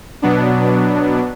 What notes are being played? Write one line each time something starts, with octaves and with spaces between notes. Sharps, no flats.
B2 F#3 B3 D4